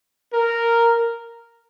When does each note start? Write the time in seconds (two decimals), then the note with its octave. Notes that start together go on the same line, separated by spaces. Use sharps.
0.33 A#4